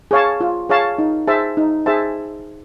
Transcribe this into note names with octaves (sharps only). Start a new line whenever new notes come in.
G#4 C#5 F5 A5
F4
G#4 C#5 F5 A5
D#4
G#4 C5 E5 A5
D#4
G#4 C5 E5 A5